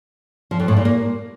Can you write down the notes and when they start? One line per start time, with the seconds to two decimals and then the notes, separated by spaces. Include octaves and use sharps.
0.51 F3
0.60 F2
0.68 A2
0.77 A#2
0.85 A#3